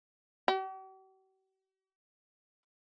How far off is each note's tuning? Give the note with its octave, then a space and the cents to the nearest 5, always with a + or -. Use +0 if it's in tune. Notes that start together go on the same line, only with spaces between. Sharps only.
G4 -45